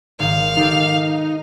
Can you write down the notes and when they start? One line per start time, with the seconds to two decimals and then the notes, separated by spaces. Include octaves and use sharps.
0.19 G#1 D#3 F5
0.57 D#3 D#4 G4 A4